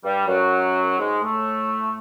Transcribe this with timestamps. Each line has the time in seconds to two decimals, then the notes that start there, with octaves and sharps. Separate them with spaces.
0.04 G2 G3
0.27 F#2 F#3
0.99 G#2 G#3
1.22 A2 A3